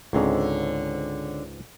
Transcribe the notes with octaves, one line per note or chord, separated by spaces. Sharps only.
C#2 G#2 D3 C4 C#5